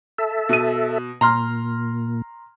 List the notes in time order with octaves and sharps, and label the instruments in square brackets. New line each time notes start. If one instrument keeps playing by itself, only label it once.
[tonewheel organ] A4 E5
[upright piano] B2 D#7
[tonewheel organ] A#2 [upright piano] A#5 C6 F6